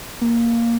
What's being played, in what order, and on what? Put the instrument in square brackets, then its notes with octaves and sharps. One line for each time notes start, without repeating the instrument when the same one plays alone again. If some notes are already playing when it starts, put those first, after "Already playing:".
[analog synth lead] A#3